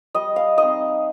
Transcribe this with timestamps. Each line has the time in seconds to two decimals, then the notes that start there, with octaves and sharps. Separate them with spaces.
0.15 G3 D#5
0.36 F5
0.58 C4 D#4 D#5